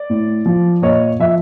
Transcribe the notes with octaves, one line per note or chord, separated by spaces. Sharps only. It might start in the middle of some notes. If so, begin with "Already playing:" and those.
Already playing: D5
A2
F3
A#2 C#5 D#5
F3 E5